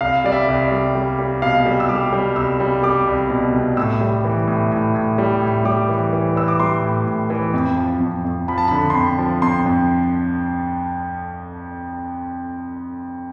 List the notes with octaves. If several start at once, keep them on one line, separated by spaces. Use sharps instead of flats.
C2 F5
G3 D5
E5
C2
D5
G3
G3
G3
B2 F5
G3
E6
G3 D6
G3
C2 E6
G3
G3 D6
C2
B2
C2
A2 E6
G3
E3
A2
A2
A2
G3
A2
G3 D6
E3
E3
E3 E6
D6
G3 C6
A2
A2
E3
F2
F3
F2
F2
F3 B5
A5
B5
D3
C6
F2 B5
F3
F2 C6
F2